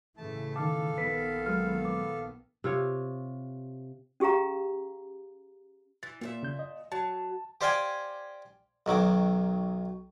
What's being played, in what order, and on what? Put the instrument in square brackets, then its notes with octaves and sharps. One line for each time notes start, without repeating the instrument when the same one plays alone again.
[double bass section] A2 C#3 E3 [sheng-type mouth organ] A3 A5
[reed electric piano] D#3 A5 [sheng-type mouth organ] A4 F5 [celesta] D6
[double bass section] A#1 D#3 B3 [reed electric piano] B4 [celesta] B6
[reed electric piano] F#3 G#3 B4 [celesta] F6
[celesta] D6
[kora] C3 F4 C#5
[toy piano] C#4 G4 G#4 F5 A#5
[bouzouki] E3 [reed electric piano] A6
[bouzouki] A#2 A4 E5 [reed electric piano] A#3
[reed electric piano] C#3 G6
D#5
[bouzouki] F#3 [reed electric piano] A5
[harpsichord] G4 C5 D5 F5 G5 G#5
B1 D#3 F#3 D6